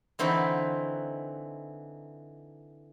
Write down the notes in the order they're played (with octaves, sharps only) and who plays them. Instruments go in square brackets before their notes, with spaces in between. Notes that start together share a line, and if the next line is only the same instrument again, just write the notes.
[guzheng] D3 E3 C4 D#4 F#4 B4